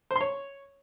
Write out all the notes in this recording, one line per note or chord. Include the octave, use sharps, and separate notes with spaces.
C5
C6
C#5